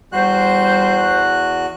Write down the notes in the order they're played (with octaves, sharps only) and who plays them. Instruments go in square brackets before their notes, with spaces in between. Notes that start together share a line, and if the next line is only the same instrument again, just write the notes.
[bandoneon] E2 F#4 F#6 [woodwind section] G3 C5